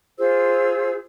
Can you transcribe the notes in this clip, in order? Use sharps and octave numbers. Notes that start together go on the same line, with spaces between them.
F4 G#4 C5 E6